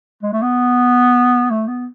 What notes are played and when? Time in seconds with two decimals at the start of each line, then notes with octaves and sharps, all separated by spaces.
0.23 G#3
0.32 A3
0.42 B3
1.50 A3
1.68 B3